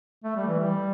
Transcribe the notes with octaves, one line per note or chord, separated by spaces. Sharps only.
A3
G3
E3
G3